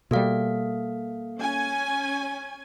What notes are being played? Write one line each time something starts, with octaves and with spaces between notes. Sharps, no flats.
B2 G3 A#3 A4 F5
C#4 G#5